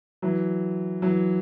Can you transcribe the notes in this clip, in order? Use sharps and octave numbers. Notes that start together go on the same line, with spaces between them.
E3 F#3
E3 F#3